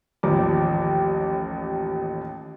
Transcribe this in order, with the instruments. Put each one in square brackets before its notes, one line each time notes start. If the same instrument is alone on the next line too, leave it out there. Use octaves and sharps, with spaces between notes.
[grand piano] A1 D#2 F3 D6